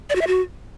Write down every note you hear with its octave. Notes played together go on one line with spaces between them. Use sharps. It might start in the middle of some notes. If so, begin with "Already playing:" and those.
D5
F#4
E5
F#4